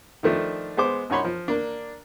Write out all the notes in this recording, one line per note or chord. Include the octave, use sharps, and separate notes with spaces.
D#3 F3 A3 D4
G#3 B3 C5 D6
F#2 D#4 F#4 C#5 B5 C6
F3
A#3 D4